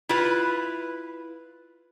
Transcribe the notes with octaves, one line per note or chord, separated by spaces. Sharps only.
E4 F4 B4